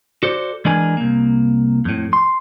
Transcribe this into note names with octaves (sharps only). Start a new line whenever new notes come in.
F#4 A4 C5 D5
E3 G#3 D4 A#4 G#5
C2 A#3
F2 A2
C6